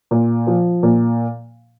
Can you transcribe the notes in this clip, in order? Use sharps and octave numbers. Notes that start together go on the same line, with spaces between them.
A#2
F3
A#2